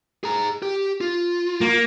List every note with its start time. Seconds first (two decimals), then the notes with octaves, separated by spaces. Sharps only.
0.24 G#4 A#5
0.63 G4
1.01 F4
1.61 A#3